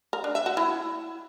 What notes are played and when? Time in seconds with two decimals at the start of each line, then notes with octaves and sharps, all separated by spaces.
0.13 A#4
0.24 D4
0.35 E5
0.46 F#4
0.57 E4